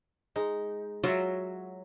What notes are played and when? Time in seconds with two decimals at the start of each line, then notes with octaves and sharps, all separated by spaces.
0.36 G#3 D#4
1.04 F#3 F4 E5